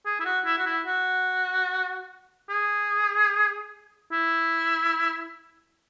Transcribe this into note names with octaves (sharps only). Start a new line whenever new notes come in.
G#4
E4
F#4
E4
F#4
E4
F#4
G#4
E4